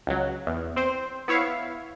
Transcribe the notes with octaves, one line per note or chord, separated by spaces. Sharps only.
C#2 F#3
E2
C4 C5
B3 E4 C#5 E5 F5